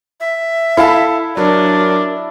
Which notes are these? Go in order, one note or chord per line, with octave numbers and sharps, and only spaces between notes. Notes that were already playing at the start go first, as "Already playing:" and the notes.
E5
E4 A4 F5 A5
F#3 D4 A#4